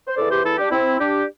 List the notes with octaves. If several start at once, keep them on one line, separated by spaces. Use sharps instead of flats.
C5
E2 E3 A4 D5
G4 C5
E4 A4
D4 G4
C4 E4
D4 G4